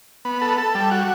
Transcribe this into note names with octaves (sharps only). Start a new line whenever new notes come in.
B3
A4
A4
G3
F#4